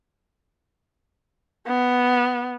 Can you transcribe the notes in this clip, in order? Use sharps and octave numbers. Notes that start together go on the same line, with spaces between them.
B3